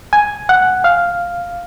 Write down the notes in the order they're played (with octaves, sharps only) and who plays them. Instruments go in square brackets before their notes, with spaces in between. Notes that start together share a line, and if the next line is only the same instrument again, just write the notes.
[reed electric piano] G#5
F#5
F5